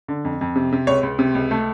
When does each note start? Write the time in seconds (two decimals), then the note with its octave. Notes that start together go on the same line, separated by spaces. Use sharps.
0.08 D3
0.25 F2
0.41 F2
0.56 C3
0.72 C3
0.87 C#2 C#5
1.03 C#2
1.19 C3
1.35 C#2
1.51 A3